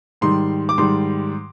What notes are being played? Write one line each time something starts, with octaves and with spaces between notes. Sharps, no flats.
G#2 D#3 G3 C6
D6
G#2 D#3 G3 C6